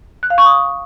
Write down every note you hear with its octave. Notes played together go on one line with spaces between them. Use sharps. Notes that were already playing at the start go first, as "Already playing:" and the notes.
F#6
F5
C#6
D#6